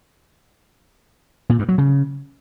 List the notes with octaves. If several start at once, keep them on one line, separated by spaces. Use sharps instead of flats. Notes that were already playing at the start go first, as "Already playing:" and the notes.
A#2
G2
F#3
C#3